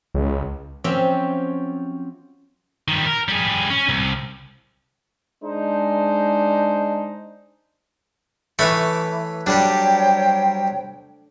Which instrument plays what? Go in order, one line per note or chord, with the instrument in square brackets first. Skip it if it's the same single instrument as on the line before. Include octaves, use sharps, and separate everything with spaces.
[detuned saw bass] C#2
[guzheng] F3 F#3 C4 C#4 G4 E5
[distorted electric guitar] D#3 G3
A#4
G3 G#4
C#4
C2
[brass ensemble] G#3 D4 D#4 C5
[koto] E3 A3 [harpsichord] B4 C#5 B5
[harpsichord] F#3 G3 G4 [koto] D4 [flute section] C5 C#5 G5